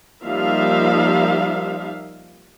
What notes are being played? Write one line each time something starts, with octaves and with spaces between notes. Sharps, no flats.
F3 G3 A#3 D#4 E5 F5